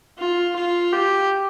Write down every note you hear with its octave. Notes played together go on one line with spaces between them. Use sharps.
F4
F4
G4